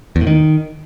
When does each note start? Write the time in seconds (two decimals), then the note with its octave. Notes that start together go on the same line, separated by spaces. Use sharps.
0.16 E2
0.21 A2
0.27 D#3